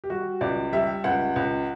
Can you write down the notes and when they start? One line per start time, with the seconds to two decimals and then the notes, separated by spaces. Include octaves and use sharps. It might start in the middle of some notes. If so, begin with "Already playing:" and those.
0.04 G4
0.10 G3 F#4
0.41 C#2 D5
0.73 G3 E5
1.04 C#2 F#5
1.36 C#2